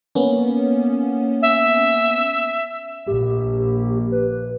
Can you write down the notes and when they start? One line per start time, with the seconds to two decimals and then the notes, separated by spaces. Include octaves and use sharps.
0.15 A#3 B3 C#4
1.42 E5
3.07 A#1 G4
4.12 B4